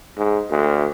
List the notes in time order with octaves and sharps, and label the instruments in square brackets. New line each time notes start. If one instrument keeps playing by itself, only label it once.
[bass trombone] G#2
D2